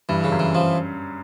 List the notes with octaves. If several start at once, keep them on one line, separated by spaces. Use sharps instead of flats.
G2 E3
C#3
F#2
E3
F3